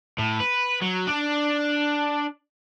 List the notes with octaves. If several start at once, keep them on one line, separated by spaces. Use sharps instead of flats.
A2
B4
F#3
D4